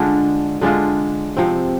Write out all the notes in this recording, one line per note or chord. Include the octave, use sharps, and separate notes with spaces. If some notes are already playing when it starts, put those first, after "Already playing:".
Already playing: D3 G#3 D4 F4
D3 G#3 D4 F4
C3 F3 C4